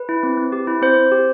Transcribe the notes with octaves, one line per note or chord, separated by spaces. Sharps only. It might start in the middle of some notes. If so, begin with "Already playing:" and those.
Already playing: B4
E4
C4
C4
G4
E4
C4 C5
C4
G4